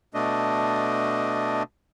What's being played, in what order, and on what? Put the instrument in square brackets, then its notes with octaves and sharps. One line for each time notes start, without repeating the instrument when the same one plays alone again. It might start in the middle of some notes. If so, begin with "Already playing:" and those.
[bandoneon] B2 A3 D4 D#5